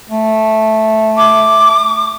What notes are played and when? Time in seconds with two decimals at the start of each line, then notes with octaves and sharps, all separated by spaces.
0.09 A3
1.17 D6